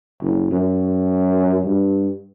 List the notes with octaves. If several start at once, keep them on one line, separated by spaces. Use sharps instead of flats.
F#1
F#2
G2